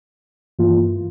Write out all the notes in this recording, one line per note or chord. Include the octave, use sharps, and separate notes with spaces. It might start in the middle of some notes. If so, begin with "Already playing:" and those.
G2 E3 A#3 F4